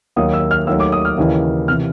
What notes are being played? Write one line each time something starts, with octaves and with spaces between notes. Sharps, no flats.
D#2 D#3 F#3 A#3 D#6
E6
F6
D#2 D#3 F#3 A3 E6
D6
D#6
F6
D#2 C#3 E3
C3 E3 F6